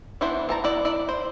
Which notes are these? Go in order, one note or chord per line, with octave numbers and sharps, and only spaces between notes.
E3 B3 D4 E4 C5
E3 A5 A#5
B3 E4 D5
E4 D5
C5